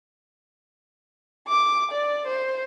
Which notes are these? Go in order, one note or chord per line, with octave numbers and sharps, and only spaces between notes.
D6
D5
C5